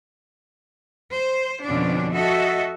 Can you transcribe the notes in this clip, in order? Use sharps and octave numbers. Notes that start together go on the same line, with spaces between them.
C5
F2 B2 D3 C#4 D4
F#4 A4 D#5 E5